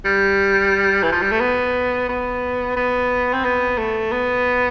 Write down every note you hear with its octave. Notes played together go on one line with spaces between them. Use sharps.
G3
E3
F3
G3
A3
B3
B3
B3
C4
B3
A3
B3